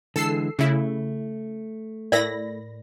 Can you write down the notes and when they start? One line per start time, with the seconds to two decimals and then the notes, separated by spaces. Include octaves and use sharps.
0.16 D3 E3 G#3 A4 E6 C7
0.59 C#3 A3 E4
2.12 A2 A#4 D5 B5 A#6